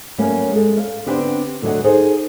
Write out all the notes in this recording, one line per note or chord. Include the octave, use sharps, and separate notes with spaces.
F#3 G3 A3 A#3 C#4
G#3 A4
F5
D3 B3 C4 D4 G4
D2 D3 F#3 A4 D#5 F#5
D#4 G#4 A4 C5